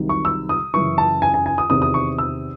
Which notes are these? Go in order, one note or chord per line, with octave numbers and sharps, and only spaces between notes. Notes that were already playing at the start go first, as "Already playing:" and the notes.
Already playing: C2 C3 D#3 F#3
C#6
E6
D#6
F#1 F#2 C#3 E3 C#6
A5
G#5
G#5
G#5
D#6
E2 C3 D#3 D#6
D#6
C#6
E6